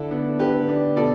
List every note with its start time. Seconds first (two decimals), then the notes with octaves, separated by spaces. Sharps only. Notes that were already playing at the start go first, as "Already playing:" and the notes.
Already playing: D3 E4 A4
0.11 B3 D4
0.39 D3 G4 B4
0.68 B3 D4
0.96 B2 A4 D5